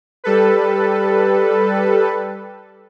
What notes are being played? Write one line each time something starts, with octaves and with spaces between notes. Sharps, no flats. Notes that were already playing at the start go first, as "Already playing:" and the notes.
G3 A4 B4